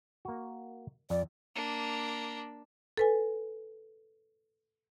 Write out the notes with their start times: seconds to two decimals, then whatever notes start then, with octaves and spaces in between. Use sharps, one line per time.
0.25 A#3 F#4
1.10 F2 D5
1.56 A#3 D4
2.97 A4 B4 G#5